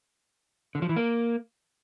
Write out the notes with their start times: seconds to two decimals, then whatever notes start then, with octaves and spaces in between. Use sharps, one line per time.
0.75 D3
0.82 F3
0.89 E3
0.97 A#3